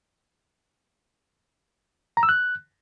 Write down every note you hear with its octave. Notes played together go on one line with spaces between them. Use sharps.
A#5
E6
F#6